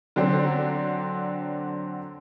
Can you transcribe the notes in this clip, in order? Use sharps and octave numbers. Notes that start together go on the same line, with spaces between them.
D3 F#3 C4 D4